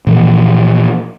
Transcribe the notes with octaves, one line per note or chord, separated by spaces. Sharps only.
A#2 E3 F3 A#3